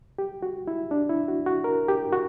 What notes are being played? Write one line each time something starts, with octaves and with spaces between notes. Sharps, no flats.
G4
F#4
E4
D4
E4
F#4
F#4
A#4
G4
F#4